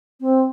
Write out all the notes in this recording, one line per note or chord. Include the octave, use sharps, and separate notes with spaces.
C4